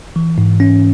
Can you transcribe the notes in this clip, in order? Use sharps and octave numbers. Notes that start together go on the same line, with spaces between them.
E3
G#2
C#4